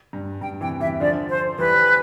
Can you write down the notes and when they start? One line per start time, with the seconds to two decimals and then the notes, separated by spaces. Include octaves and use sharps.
0.13 G2
0.41 G2 G5
0.61 C3 E3 G5
0.80 C3 E3 E5
1.00 D3 F3 D5
1.29 C5
1.58 E3 G3 B4